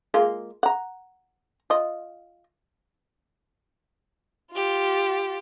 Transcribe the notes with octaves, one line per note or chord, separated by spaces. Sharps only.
G#3 A#3 F4
F#5 A#5
F4 D#5
F4 G4